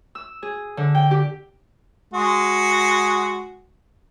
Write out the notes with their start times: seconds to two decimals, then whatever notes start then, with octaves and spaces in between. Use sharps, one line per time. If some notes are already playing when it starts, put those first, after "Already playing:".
0.15 E6
0.43 G#4
0.77 D3
0.95 G5
1.11 G4
2.14 G#3 F#4